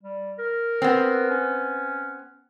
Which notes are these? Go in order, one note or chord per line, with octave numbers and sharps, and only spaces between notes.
G3
A#4
B3 C4
C#4